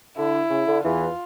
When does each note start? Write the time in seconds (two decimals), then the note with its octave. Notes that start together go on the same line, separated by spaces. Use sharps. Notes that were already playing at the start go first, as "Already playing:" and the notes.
0.17 D3 E4
0.50 C#3
0.67 D3
0.84 E2 E3 F4